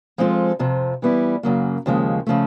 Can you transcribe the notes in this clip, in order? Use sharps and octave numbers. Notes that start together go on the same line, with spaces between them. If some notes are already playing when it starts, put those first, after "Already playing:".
F3 G#3 C4 F4 A4
F2 C3 F3
E3 G3 B3 E4
F#2 C#3 F#3 A#3
D#2 C#3 F3 G#3
C#3 F3 A3